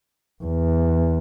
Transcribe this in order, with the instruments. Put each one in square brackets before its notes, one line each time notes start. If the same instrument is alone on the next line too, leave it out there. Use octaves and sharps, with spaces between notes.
[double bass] E2